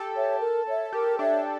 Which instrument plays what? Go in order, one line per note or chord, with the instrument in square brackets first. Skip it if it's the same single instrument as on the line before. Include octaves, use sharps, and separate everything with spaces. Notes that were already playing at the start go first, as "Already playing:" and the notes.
Already playing: [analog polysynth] G4 A4
[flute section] C#5 E5
A#4
C#5 E5
[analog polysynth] G4 [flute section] A#4
[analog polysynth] D4 [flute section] C#5 E5